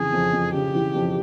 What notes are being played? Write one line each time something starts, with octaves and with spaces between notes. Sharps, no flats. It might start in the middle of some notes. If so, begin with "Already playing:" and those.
Already playing: F2 C#3 E3 G#4
F2
F2
C#3 G4
E3
F2